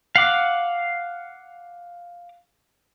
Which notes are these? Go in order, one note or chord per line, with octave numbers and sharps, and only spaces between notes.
F5 F#5 D6